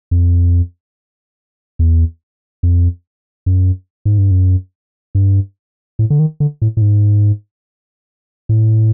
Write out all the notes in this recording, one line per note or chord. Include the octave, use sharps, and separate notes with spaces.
F2
E2
F2
F#2
G#2
G2
F#2
G2
A2
D3
D#3
D3
A2
A2
G#2
A2